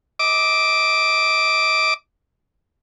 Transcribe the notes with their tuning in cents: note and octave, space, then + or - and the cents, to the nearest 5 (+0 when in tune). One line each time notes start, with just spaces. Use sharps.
D#5 +35 D6 +0